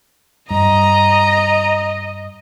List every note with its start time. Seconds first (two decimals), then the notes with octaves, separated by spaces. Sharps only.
0.50 G2 D#5 A#5